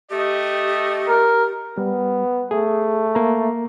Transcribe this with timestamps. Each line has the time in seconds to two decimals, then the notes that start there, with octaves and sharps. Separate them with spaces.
0.10 A3 G4 D#5
1.09 A#4
1.78 G3 B3
2.51 A3 G#4
3.15 A#3 A#5